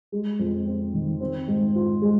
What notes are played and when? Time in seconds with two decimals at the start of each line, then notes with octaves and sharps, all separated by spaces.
0.12 G#3
0.39 F2
0.66 C4
0.93 D#3
1.20 C4
1.48 G#2
1.75 F4
2.02 G#3